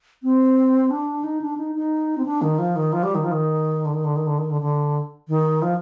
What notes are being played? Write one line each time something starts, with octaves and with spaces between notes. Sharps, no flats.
C4
D4
D#4
D4
D#4
D#4
C4
D4
D#3
F3
D#3
F3
G3
D#3
F3
D#3
D3
D#3
D3
D#3
D3
D#3
D3
D3
D#3
F3